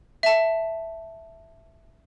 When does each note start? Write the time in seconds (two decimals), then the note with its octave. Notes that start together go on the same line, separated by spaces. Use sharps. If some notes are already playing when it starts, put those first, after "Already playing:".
0.23 E5 A5